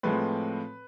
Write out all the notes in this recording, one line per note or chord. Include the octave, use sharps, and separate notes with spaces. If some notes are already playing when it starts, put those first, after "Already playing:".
A2 F3 G#3 C4 B4